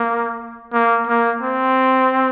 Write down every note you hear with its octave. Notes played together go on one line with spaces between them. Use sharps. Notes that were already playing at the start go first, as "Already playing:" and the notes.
Already playing: A#3
A#3
A#3
C4